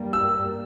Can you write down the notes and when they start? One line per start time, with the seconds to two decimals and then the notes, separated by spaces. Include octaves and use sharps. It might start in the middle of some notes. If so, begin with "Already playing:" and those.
Already playing: G2 G3 A#3
0.13 E6